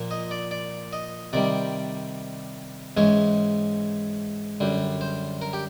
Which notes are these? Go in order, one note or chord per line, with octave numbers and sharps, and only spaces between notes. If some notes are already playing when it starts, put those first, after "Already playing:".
Already playing: A#2 F3 A#3
D#5
D5
D5
D#5
C3 D#3 G3 D5
G#2 E3 G#3 C#4 C#5
F#2 D3 G3
C5
A#4
G4